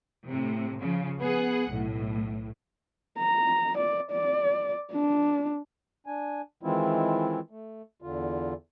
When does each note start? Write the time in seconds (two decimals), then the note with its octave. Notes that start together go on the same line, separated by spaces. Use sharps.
0.27 A2 C3
0.81 C#3 F3
1.20 B3 G#4 F#5
1.72 B1 A2
3.19 A#5
3.77 D5
4.11 D5
4.92 D4
6.07 D4 G#5
6.63 D#3 E3 G#3 C4 E4 F4
7.50 A3
8.02 E2 D3 F4